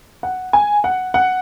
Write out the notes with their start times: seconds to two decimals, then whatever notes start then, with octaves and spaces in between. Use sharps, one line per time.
0.23 F#5
0.53 G#5
0.84 F#5
1.14 F#5